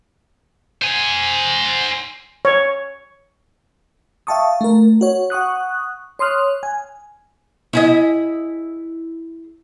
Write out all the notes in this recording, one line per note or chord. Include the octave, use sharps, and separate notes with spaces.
C5 G#5
C#5
E5 F5 G5 A5 C#6 D#6
A3 A#4
F#4 C#5
F#5 C#6 D#6 F#6
C#5 C6 D#6 F6 F#6
G#5
E4 G#4 D#5